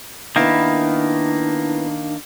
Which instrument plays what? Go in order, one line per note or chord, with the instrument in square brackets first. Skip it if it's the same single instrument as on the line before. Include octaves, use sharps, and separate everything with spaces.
[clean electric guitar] D#3 A#3 [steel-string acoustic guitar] B3 E4 B4 [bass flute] D4